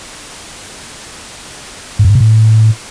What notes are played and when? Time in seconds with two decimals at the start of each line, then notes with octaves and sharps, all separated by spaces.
1.99 G#2
2.05 F#2
2.10 G#2
2.15 B2
2.20 A2